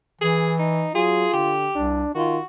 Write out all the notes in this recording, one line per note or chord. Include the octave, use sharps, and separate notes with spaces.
E3 G#4
D#4
F#3 F4 G#4
D3 G4
C2 D4
D#3 F4 F#4